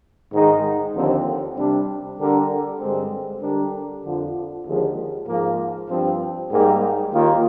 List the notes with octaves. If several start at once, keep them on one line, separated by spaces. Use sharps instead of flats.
G#2 D#3 G#3 D#4
D#2 D3 F3 C4
C3 G3 D4
D3 G3 D4 G4 A#4
G2 D3 G#3 C4
D3 G3 D4 G4 A#4
F2 D3 F3
D#2 D3 F3 G#3
G#2 F3 A#3
G2 F3 C4
G#2 G3 A#3 D#4 G4
D#2 D#3 A#3 F4